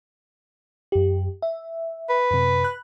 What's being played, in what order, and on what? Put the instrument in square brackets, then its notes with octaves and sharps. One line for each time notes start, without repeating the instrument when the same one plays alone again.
[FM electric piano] F#2 G4
E5
[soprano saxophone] B4
[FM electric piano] F#2 C3
B5 F#6